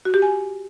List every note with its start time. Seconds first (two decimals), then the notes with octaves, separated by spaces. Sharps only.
0.05 F#4
0.14 G4
0.22 G#5